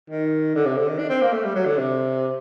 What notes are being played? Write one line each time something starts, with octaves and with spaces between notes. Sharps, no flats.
D#3
D3
C3
D3
D#3
D4
C4
A#3
A3
G3
F#3
D3
C3